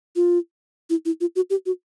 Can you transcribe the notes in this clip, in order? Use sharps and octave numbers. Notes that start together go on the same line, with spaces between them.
F4
E4
E4
F4
F#4
G4
F#4